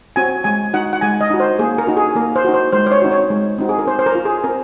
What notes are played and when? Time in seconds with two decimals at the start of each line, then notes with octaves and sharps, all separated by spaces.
0.16 C4 F#4 G#5
0.44 G#3 G#5
0.73 D#4 F#4 F#5
0.93 F#5
1.01 G#3 G#5
1.21 D#5
1.30 D#4 F#4
1.40 C5
1.59 A#3 G#4
1.78 A#4
1.87 D#4 F#4
1.97 G#4
2.15 A#3 A#4
2.36 C5
2.44 D#4 F#4
2.54 C5
2.72 G#3 C5
2.86 C5
2.91 C#5
3.02 C4 D#4 F#4
3.11 C#5
3.30 G#3
3.58 C4 D#4 F#4
3.69 G#4
3.79 A#4
3.87 C4 C5
3.99 C5
4.06 A#4
4.15 F4
4.25 G#4
4.44 C4 A#4